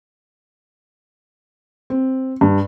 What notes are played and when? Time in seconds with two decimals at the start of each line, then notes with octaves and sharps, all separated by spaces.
1.90 C4
2.41 G2